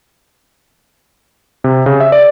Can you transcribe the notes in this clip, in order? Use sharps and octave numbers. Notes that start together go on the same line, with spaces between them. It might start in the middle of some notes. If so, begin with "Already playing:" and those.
C3
C#3
E5
D5